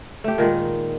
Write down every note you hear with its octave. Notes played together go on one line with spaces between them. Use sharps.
A3 G4
A#2 D#3 G#3